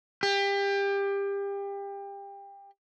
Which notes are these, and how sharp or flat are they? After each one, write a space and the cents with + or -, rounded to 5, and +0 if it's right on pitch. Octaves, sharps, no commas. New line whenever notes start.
G4 +25